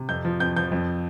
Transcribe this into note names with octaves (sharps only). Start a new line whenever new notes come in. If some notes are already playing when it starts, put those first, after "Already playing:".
Already playing: C3
F2 G6
F3
F2 G6
F3 G6
F2